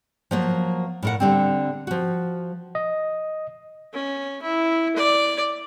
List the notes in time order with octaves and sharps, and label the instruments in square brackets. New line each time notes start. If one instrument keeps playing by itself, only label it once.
[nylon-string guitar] F3 F#3 A#3
A2 A#4 F#5
D3 G3 C4
F3 F#4
[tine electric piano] D#5
[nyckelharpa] C#4
E4
D5